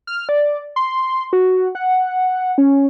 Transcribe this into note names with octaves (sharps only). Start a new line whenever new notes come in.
F6
D5
C6
F#4
F#5
C#4